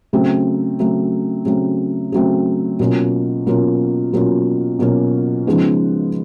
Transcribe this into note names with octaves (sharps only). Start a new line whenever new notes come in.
C#3 F#3 A3 C4
C#3 F#3 A3 C4
C#3 F#3 A3 C4
C#3 F#3 A3 C4
B2 F#3 A#3 C#4 F4
B2 F#3 A#3 C#4 F4
B2 F#3 A#3 C#4 F4
B2 F#3 A#3 C#4 F4
C#3 F3 G#3 B3 D#4